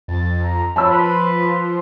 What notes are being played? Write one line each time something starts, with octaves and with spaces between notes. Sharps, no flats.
F2 A6
A#5
F3 C#5 A5 B5 E6
B4 C6